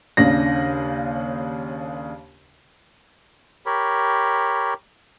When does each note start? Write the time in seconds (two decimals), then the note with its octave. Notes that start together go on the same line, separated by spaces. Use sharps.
0.17 D#2 C#3 D4 A#6
3.66 G4 A#4 C#5 B5